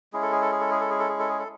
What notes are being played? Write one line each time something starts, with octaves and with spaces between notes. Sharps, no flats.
G#3 C#4 E4 G#4
A4
G#4
A4
G#4
A4
G#4
A4
G#4
A4
G#4
A4
G#4
A4